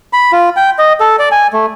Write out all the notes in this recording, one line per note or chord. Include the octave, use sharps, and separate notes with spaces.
B5
F4
G5
D#5
A4
D5
G#5
A3